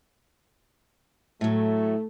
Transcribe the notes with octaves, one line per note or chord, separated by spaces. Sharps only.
A2 F#3 A3